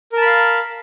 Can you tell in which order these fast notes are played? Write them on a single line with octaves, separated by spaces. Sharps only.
A#4 A5 B5 F5